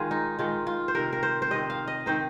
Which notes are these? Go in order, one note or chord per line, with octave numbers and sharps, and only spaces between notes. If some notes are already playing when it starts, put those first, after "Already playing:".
Already playing: D#3 G#3 F4 G#4
D#4
D#3 G#3 D#4 F4
F4
C5
C3 D#3 C4 A#4
A#4
C5
C5
C3 D#3 C4 D#5
F5
D#5
D#3 C4 D#4 C5